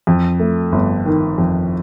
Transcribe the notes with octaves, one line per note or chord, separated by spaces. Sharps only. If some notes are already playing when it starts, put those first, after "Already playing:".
F2
A3
G1
D#3
F2